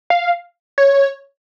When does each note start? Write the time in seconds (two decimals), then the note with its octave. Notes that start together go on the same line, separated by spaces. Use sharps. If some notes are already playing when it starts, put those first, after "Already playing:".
0.10 F5
0.78 C#5